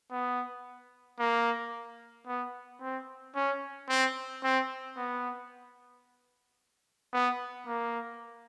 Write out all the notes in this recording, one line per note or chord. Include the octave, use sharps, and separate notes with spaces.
B3
A#3
B3
C4
C#4
C4
C4
B3
B3
A#3